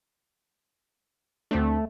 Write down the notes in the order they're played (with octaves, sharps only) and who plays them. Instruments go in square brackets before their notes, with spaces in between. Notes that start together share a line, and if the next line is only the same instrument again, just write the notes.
[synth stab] D2 C4 D4 [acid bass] A3